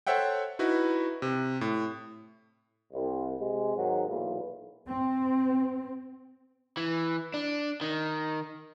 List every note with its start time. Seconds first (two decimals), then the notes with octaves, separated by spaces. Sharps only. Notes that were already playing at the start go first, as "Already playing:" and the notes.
0.07 A4 C5 C#5 E5 F#5 G5
0.59 D#4 E4 F#4 B4
1.22 C3
1.61 A2
2.92 C2
3.39 C3 G#3
3.75 G#2 D#3 F#3
4.07 B1 E2 A#2
4.86 C4
6.77 E3
7.34 D4
7.81 D#3